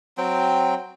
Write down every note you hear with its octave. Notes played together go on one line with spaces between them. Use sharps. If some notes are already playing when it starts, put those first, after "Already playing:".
F#3 C4 G5